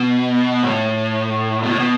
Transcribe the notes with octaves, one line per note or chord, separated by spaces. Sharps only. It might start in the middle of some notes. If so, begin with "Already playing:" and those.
Already playing: B2
A2
B2
A2
B2